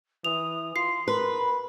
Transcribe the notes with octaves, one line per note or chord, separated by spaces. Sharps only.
E3 D#6 F7
F4 C6 C7
A#4 B4 C6
B5